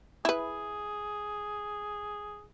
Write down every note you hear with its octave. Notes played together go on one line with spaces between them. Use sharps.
E4 G#4 B4